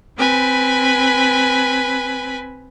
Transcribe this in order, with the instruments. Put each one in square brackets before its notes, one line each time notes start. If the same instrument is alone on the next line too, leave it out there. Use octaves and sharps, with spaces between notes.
[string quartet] C4 B4 G#5 B5